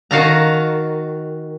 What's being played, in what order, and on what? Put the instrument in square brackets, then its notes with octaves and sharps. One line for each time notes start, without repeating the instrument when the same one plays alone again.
[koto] D#3 F#4 F5 A5 A#5